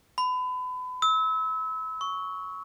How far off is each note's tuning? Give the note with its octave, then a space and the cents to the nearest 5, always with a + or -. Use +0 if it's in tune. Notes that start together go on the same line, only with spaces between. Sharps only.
B5 +30
E6 -30
C#6 +10